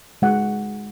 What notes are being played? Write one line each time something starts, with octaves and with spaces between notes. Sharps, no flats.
G#3 D#4 F#4 F#5